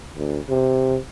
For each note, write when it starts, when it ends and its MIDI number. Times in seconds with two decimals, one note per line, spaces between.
0.16 0.39 38
0.49 0.97 48